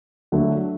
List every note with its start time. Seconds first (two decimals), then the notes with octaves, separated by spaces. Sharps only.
0.32 D3 F#3 A3